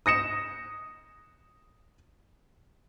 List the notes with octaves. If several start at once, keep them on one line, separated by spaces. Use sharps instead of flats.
D#6 A#6 C#7 E7